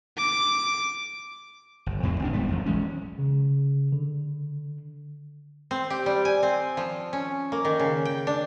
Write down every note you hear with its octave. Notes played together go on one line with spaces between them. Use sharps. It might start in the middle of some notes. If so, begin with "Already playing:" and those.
D6
G1
F2 A2 C4
G1 A#2 D4
D#1 G#2 G3 B3
D#1 F#3
A#1 E3 G#3 C#4
C#3
D3
C4
G4
G3
G#5
C4
F3
C#4
A#3
D#3
C#3
G5
D4